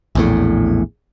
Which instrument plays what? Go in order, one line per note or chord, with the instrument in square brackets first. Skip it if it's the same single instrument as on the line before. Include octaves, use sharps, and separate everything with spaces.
[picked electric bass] A#1 E2 A2